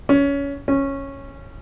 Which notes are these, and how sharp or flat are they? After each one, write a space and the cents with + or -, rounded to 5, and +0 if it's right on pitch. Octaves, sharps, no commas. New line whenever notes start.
C#4 +20
C#4 -10